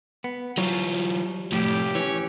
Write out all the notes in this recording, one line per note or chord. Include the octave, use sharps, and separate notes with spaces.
B3
E3 F#3 G3 F4 C#5
F2 A2 F3 A3 G4
E3 C#4 C#5